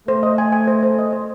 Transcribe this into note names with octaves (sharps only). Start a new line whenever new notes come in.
A3 C5
D#5
G#5
G#5
C5
C5
D#5
C5